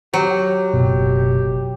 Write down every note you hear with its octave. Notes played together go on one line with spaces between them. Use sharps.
F#3 G4
F#1 B2